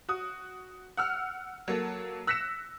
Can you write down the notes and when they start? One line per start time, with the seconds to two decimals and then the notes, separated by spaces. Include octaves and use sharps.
0.09 F#4 D#6
0.97 F#5 E6 F6
1.68 F#3 A#3 A4
2.27 E6 F#6 A#6 B6 C#7 E7